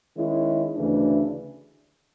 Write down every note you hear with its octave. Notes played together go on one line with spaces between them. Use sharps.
D#3 G#3 C#4 E4
D2 C#3 E3 A3 D4